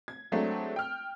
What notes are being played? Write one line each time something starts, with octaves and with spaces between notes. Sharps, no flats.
G#6
F#3 G#3 A3 C4 D4
G5 F6